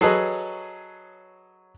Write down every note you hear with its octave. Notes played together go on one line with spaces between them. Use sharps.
F#3 G#4 A4 B4 C#5 D#5